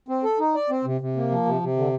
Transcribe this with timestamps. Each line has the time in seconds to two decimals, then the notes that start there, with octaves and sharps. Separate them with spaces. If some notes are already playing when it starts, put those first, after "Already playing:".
0.08 C4
0.23 A4
0.39 D#4
0.55 D5
0.70 C4
0.84 C3
1.01 C3
1.16 A#3
1.31 F3
1.46 C3
1.61 C3
1.77 D3